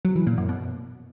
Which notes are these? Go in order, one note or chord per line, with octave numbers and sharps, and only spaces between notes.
F#3
E3
A#2
F#2
B2